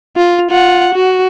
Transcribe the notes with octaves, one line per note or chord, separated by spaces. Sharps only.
F4
F4 F#5
F#4